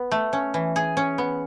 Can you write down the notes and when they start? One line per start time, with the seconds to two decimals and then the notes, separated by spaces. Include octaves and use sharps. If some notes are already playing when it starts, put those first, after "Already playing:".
Already playing: B3
0.11 A3
0.33 C#4
0.54 E3
0.76 G#4
0.97 C#4
1.18 B3